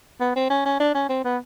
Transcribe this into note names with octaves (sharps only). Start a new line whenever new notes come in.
B3
C4
C#4
C#4
D4
C#4
C4
B3